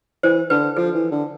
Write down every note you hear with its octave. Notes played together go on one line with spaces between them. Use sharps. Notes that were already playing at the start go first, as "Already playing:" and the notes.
E3 C5
D3 B4
F3 A4
E3
D3